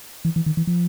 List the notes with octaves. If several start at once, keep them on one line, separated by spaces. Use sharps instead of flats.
E3
E3
D#3
E3
F3